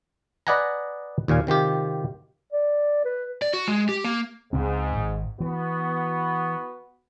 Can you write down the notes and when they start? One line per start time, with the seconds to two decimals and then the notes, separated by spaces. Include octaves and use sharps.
0.47 B4 D5 D#5 F#5 G#5 A#5
1.28 D#2 A#2 F5 G#5
1.47 C3 D#3 F4 G4
2.53 D5
3.05 B4
3.42 D5
3.54 F#4
3.68 G#3
3.89 G4
4.04 A#3
4.53 C#2 G#2 C#3 C4
4.96 G#1
5.40 E3 B3 F#4